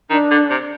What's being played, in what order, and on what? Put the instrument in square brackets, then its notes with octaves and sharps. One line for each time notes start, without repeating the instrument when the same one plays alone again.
[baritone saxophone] D#3 [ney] D4
[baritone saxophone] D3
C3